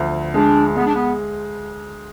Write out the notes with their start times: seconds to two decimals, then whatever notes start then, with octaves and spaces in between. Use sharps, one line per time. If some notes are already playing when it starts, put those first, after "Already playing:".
Already playing: D2 D3 F3
0.34 G#3 D4
0.76 G#3 B3
0.86 D4
0.94 B3